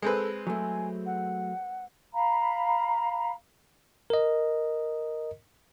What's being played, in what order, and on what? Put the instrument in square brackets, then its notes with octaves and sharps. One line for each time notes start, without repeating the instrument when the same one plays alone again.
[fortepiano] G#3 C4 B4 [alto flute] A4
[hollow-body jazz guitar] F#3 A3 [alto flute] G#5
[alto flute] F#5
[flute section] F5 A#5 B5
[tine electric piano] A#4 D#5